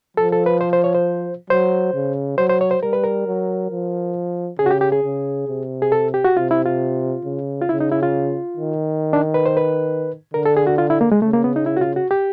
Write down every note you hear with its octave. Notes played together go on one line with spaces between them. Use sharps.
F3 A4
A4
B4
C5
C5
C#5
C5
F#3 C5
C#3
F#3 C5
C5
C#5
C5
G3 A#4
B4
A#4
F#3
F3
C#3 G#4
F#4
G4
G4
G#4
C#3
C3
G#4
A4
G4
F#4
C3 F4
E4
F4
C#3
F4
C#3 E4
D#4
E4
F4
D#3
D4
B4
C5
B4
D3 A#4
A4
G#4
F#4
F4
E4
A#3
G#3
C#3 A3
A#3
B3
D#4
E4
F#4
F4
F#4
G4